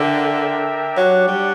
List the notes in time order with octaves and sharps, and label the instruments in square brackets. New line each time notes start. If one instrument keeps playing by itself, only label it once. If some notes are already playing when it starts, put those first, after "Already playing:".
Already playing: [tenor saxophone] D3 [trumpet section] D4 A#4 E5 G5
[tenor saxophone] F#3 [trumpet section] D4 G4 C#5 F#5
[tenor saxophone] G3